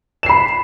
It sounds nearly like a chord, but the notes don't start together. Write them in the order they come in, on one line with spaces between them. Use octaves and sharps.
E7 C7 B5